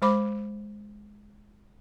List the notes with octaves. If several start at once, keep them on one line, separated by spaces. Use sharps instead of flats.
G#3 C5 B5 D6